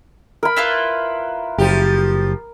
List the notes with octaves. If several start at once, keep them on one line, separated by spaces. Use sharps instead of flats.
A#4 B5
E4 F4 B4
F#1 F3 G4